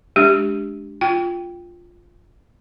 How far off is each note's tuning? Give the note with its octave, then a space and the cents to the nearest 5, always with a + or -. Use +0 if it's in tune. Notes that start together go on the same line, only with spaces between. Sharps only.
G#3 +20 D4 +0 G4 +0
F4 +0 G5 +0